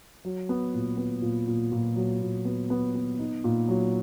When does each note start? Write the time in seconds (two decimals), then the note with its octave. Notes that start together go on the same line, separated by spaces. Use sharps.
0.25 F#3
0.49 B3
0.74 A#2
0.97 B3
1.22 A#2
1.48 A#2
1.72 A#2
1.96 F#3
2.21 A#2
2.45 B3
2.70 B3
2.95 B3
3.19 D#4
3.44 A#2
3.69 F#3